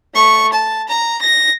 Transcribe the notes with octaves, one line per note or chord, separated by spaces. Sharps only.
A3 C#6
A5
A#5
A#6